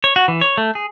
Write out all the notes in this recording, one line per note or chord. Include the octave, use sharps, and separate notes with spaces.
C#5
F#4
E3
C#5
A3
G#4